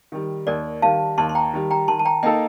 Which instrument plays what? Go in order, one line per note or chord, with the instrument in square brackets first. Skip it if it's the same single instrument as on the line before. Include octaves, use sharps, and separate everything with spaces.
[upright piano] D#3 G3
[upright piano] D#2 [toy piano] A#4 D5
[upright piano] D#3 G3 [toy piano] F5 A5
[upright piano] D#2 [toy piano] A5 C6
[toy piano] C6
G5 A#5
[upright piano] D#3 G3
[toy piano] G5 A#5
[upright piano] D#3 [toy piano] A5 C6
[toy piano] A5
G5 A#5
[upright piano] A#3 D#4 A4 [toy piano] D#5 G5